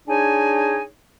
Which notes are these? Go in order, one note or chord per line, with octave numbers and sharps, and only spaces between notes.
D4 D#4 G#4 C#5 G#5